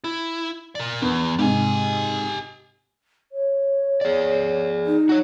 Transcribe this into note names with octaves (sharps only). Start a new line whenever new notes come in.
E4
A#4 D5
E2 B3
G#2 C3 G4 G#5
C#5
G#4 D5
D#4
F#4 C#5